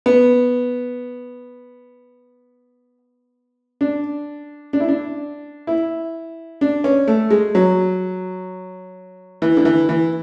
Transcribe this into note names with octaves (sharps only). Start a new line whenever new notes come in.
B3
D4
D4
E4
D4
E4
D4
C#4
A3
G#3
F#3
E3
D3
E3
E3